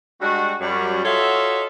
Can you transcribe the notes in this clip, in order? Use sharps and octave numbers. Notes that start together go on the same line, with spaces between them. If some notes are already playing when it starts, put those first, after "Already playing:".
G3 G#3 D4 F#4
F#2 G3
F4 F#4 A4 C#5 D#5 E5